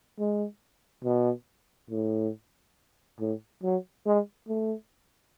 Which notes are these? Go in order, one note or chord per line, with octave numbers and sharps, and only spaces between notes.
G#3
B2
A2
A2
F#3
G#3
A3